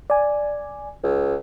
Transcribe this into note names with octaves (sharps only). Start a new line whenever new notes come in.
D5 G#5
C#2